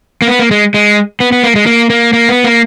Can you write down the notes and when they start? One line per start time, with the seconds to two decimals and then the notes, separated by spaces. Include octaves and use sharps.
0.22 A#3
0.28 B3
0.39 A#3
0.51 G#3
0.74 G#3
1.20 B3
1.32 B3
1.44 A#3
1.55 G#3
1.66 A#3
1.90 A#3
2.13 A#3
2.29 B3
2.44 A#3